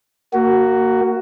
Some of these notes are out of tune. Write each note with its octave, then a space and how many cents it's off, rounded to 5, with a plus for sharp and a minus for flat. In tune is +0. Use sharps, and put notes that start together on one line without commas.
A#3 -15 F#4 +15